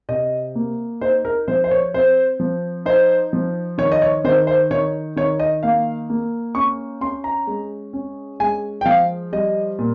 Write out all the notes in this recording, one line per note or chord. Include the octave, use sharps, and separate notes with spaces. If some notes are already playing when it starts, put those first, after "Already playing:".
C3 D#5
A#3
D#4 C5
A#4
F3 C5
C5
C#5
C4 C5
F3
D#4 C5
F3
D#3 C#5
D#5
C#5
D#3 C5
C5
D#3 C#5
D#3 C#5
D#5
A#3 F5
A#3
C#4 C#6
C#4 C6
A#5
G#3
C#4
G#3 G#5
G5
F3 F5
G3 D#5
A#2